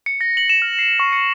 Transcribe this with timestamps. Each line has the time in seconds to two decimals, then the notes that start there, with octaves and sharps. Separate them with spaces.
0.06 C#7
0.21 A#6
0.37 F#7
0.49 E7
0.62 F6
0.79 C7
1.00 C#6
1.13 C#7